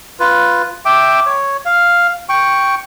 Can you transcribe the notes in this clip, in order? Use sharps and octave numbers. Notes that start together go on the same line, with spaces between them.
F4 B4
E5 G5 D6
C#5
F5
G5 C#6